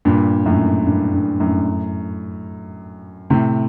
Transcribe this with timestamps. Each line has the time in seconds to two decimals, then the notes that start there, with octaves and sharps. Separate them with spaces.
0.05 G2 A#2
0.46 F#2 A2
0.86 G2
1.13 G2
1.40 F#2 A2
3.30 A2 C3